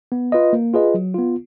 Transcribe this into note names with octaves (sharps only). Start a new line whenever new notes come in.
B3
F4 B4 D#5
A#3
F4 G#4 B4 D#5
F#3
B3 F4